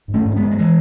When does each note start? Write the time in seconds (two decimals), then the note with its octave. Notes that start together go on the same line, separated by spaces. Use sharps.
0.08 G#2
0.14 A3 C#4
0.25 G#2
0.31 C#4
0.36 G#3 B3
0.42 G#2
0.51 F#3
0.58 E3 G#3